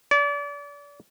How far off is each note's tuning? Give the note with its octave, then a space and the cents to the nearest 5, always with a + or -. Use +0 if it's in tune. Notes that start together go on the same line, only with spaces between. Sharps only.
D5 -35